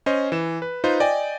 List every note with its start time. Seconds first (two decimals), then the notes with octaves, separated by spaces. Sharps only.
0.06 C#4 C5 D#5
0.32 E3 E7
0.62 B4
0.84 D#4 F4 B4 C5
1.00 D5 D#5 G5 G#5